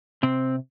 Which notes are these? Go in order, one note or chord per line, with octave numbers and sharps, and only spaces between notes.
C3 C4